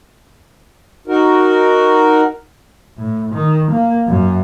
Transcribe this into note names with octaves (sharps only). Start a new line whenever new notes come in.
D#4 F#4 A#4
A2
D#3
A#3
F#2